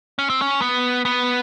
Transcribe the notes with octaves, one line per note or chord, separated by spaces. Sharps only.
C#4
C4
C#4
B3
B3